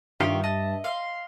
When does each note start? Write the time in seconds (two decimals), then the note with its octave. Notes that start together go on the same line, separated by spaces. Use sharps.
0.21 G2 D#3 F4 G4 C#5 E5
0.44 D#5 A5
0.84 F5 C6